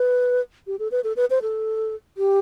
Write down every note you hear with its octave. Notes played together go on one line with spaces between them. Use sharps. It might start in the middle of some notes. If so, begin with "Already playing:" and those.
Already playing: B4
G4
A4
B4
A4
B4
C5
A4
G4